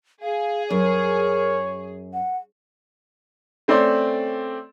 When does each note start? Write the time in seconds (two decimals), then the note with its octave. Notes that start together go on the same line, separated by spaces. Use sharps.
0.22 G#4 F5
0.70 F#2 A#4 C#5
2.13 F#5
3.68 A3 C4 C#4 D5 C6